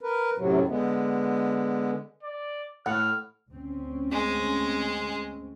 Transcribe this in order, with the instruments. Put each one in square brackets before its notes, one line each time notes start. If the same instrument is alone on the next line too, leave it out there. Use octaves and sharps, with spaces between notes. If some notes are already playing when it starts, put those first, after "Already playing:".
[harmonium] A#4 B4
F#2 A2 C3 F#3
D3 G#3 B3
[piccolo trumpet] D5
[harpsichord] A2 [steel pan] F#5 [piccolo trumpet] F6
[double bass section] D2 C4 C#4
[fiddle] G#3